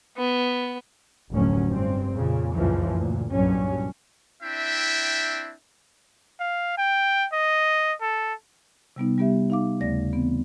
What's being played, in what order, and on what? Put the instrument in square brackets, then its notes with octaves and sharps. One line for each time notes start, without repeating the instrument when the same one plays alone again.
[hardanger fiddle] B3
[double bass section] F1 D2 A2 F#3 C#4
G2 C4
F2 A#2 C#3
C#2 F#2 A#2 E3 F3
D2 A#2
C2 G2 A#2 F#3 C#4
[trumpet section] C4 D4 E4 E5 G5
[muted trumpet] F5
G5
D#5
A4
[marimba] C3 G3 B3 D#4
G3 B3 G4 E5
D#4 F5 D6
D#2 C#3 A3 D5 A#6
E3 B3 C4